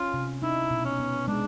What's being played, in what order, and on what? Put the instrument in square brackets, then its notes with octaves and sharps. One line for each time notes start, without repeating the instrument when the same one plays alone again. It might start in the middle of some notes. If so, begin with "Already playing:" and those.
Already playing: [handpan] C#4 [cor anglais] F4
[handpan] C3
[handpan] D#4 [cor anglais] E4
[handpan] B2
[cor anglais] C#4
[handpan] B3
[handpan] G#3 [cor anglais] D4